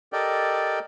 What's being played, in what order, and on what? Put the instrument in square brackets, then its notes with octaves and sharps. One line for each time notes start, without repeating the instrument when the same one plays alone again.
[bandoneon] G4 A4 A#4 D5 D#5 G5